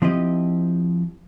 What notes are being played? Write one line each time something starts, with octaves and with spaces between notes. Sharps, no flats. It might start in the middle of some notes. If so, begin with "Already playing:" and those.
F3 C4 E4 G4 D#5